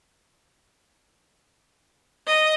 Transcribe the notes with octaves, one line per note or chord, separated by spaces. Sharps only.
D#5